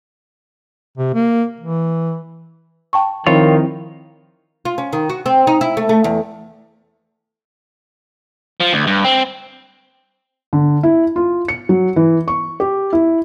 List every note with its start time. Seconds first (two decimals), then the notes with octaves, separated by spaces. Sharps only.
0.98 C3
1.14 A#3
1.60 E3
2.93 G5 A5 C#6
3.27 D#3 F3 C4 E4 F4 C#5
4.65 F4
4.78 C#4
4.93 D#3
5.10 F#4
5.26 C4
5.47 D#4
5.61 E4
5.77 A3
5.89 A3
6.04 E2
8.60 F3
8.73 D2
8.87 G2
9.04 C4
10.53 D3
10.83 E4
11.16 F4
11.48 C#7
11.69 F#3
11.96 E3
12.28 C#6
12.60 G4
12.93 E4